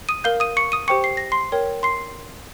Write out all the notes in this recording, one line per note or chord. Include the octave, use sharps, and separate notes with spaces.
D#6 D#7
A#4 F5 G6 G7
D#6 D#7
C#6 C#7
D#6 D#7
G4 C5 G5 C#6 C#7
C7
A#6
C6 C7
A#4 C#5 G5
C6 C7